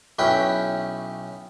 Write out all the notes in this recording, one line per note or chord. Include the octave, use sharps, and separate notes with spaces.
B1 C#4 E4 B4 G5